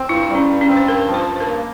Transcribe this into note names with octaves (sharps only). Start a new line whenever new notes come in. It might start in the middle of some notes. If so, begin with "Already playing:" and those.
Already playing: C4
G2 E4
E4
G3
C#4
G2
C#4
C4
C5
G2 A#4
F3
C5
G2
C5
A#4
A#3